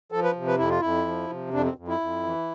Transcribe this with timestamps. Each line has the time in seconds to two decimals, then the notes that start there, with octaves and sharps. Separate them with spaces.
0.12 F3 A4
0.23 B4
0.36 C3
0.47 B4
0.58 F2 E4
0.70 F4
0.80 F2 E4
1.07 F3
1.29 C3
1.53 F2 D4
1.65 C4
1.76 F2
1.88 E4
2.00 F2
2.24 E3